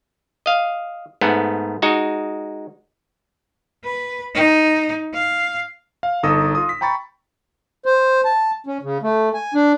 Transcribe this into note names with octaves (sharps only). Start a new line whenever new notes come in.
D#5 F5
G#2 A3 B3
G#3 D#4 F#4
B4
D#4
F5
F5
G1 D#4 A4 D#6 E6 A#6
F4 D#6
B6
G5 A#5 B5 C#6 A6
C5
A5
C#4
C#3
A3
G#5
D4